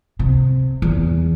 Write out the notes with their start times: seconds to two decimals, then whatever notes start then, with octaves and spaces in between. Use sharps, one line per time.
0.19 C3
0.82 E2